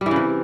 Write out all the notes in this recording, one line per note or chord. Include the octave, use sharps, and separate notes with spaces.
G3
E3
C#3
C3